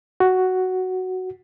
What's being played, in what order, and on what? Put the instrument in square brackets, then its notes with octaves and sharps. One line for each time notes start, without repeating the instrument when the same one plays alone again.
[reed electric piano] F#4